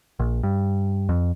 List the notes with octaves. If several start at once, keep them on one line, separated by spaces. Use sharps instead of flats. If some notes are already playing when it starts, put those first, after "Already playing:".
A#1
G2
F2